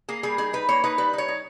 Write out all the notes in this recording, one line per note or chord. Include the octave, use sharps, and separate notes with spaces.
A#3 G#4
G3 G#4
D#4 G#4
D#4 B4
A#3 C#5
D#4 B4
G3 B4
D#4
C#5
D#4